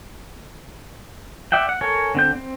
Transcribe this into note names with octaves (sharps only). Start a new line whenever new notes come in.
D5 E5 F#5 G5
F#5
A4 A#4 C#5 G#5
D3 C4 G6
C4